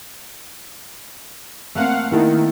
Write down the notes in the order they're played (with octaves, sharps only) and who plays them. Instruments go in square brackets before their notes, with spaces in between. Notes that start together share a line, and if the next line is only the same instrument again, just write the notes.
[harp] A3 A#3 C4 [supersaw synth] F5 F#5
[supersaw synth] D#3 [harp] A#3 E4 A4